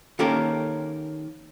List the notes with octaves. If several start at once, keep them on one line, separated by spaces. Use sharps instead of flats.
D#3 A#3 C#4 G4 A4 A#4